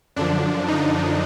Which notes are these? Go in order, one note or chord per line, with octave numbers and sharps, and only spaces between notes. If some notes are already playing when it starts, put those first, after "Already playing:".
F#2 D3 F3 D4
D#4